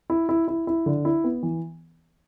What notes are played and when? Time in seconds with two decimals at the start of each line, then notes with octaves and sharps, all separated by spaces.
0.10 E4
0.29 E4
0.48 E4
0.67 E4
0.86 D3
1.05 E4
1.24 B3
1.43 E3